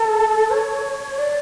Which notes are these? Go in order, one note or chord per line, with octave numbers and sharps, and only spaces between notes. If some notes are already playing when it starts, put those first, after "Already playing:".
Already playing: A4
C#5
D5